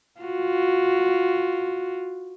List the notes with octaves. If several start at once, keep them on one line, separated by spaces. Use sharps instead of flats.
F4 F#4